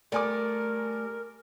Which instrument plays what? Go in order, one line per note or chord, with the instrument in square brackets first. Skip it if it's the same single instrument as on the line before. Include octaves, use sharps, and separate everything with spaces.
[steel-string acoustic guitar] G3 A3 [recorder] A#4 [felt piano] D5 G#5 D6